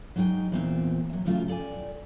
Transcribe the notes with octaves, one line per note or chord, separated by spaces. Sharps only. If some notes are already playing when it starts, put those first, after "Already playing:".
F#3 G#3 D#4 F5 G5
E2 A#2 C4
F#3 E5
F#2 C#3 F#3 A3 F4
A4 D5 G5 G#5